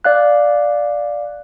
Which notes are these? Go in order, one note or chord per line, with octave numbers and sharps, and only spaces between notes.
D5 F5 F#6